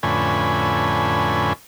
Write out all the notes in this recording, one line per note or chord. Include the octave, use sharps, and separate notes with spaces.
F2 A2 D3 C#4 B4 G#5